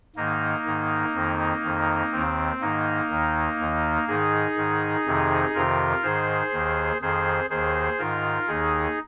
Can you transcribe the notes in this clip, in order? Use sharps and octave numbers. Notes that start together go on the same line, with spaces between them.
G#2 D#3 A#3 D#4
G#2 D#3
F2 D#3
F2 D#3
D#2 D#3 C4
G#2 D#3 A#3 D#4
D#2 D#3
D#2 D#3
G#2 D#3 D#4 G#4
G#2 D#3
F2 C3 D#3
F2 C3 D#3 F4 A#4
G#2 D#3 G#4 C5
D#2 D#3
F2 D#3 G#4 C5
D#2 D#3 G#4 C5
G#2 D#3 F4 A#4
D#2 D#3 D#4 G#4